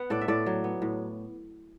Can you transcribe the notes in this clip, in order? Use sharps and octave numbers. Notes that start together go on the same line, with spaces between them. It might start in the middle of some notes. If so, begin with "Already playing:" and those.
Already playing: B3 B4 F#5
A2 A4 D5
E5
A2 A4 D5
F#3
B3
A2